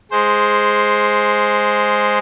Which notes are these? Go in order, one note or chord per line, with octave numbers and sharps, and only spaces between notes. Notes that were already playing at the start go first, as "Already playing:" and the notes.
G#3 C5